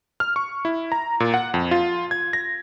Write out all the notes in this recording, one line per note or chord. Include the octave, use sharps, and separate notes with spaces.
F6
C#6
E4
A#5
A#2
F#5
F2
F4
G#6
A#6